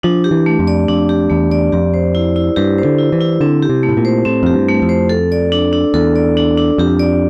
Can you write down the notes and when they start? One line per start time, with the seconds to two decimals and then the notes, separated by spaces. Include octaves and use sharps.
0.03 F3 D4
0.24 G4
0.31 E3
0.46 A3
0.59 F2
0.67 D5
0.88 F2 D4
1.09 G4
1.30 E2 A3
1.51 D5
1.72 F2 G4
1.94 C5
2.15 E4
2.36 E4
2.56 G2 G4
2.78 C5
2.85 D3
2.98 E4
3.12 E3
3.20 E4
3.41 D3 C4
3.63 G4
3.70 C3
3.83 A3
3.89 A2
3.97 A#2
4.05 C5
4.25 A2 C4
4.43 F2 G4
4.54 G2
4.68 A3
4.82 F2
4.89 C5
5.09 A4
5.32 D5
5.52 D4
5.73 D4
5.94 E2 A4
6.16 D5
6.37 D4
6.57 D4
6.78 F2 G4
6.99 D5